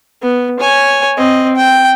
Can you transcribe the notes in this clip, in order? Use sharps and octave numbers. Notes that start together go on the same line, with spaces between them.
B3
C#5 G#5
C4 D#5
G5